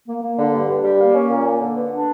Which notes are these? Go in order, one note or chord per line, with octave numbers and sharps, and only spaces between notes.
A#3
A#3
D3
G2
G2
G3
A#3
C#4
A#2
A#3
D3
B3
D4